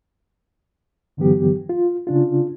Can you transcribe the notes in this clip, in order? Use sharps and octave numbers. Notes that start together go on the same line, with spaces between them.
G2 D3 E3 F#3 B3 G4
F4
C#3 D4 F4